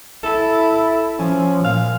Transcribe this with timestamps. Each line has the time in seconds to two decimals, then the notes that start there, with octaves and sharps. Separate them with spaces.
0.24 E4 A4
1.19 F3 C#4
1.64 A#2 F5